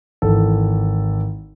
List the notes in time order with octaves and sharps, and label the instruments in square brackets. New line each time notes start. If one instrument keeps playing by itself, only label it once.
[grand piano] G#1 E3 A4